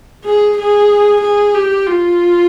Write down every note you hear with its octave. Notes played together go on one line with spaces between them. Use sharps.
G#4
G#4
G#4
G4
F4